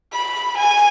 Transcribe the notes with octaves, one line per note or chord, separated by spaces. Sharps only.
B5
G#5